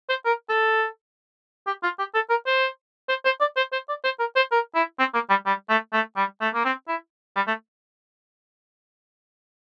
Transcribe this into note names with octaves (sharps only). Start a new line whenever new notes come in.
C5
A#4
A4
G4
F4
G4
A4
A#4
C5
C5
C5
D5
C5
C5
D5
C5
A#4
C5
A#4
E4
C4
A#3
G3
G3
A3
A3
G3
A3
A#3
C4
E4
G3
A3